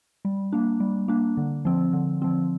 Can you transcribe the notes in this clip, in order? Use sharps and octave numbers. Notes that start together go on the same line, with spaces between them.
G3
A#3 D4
G3
A#3 D4
D3
F3 C4
D3
F3 C4